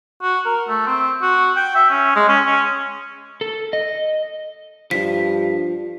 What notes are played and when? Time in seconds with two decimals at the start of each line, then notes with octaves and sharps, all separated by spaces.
0.22 F#4
0.46 A#4
0.68 A3
0.87 C4
1.22 F#4
1.56 G5
1.75 E5
1.91 C#4
2.16 G#3
2.29 C#4
2.46 C#4
3.41 A4
3.73 D#5
4.91 G2 F3 B6